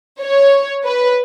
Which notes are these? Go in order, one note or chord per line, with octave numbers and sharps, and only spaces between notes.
C#5
B4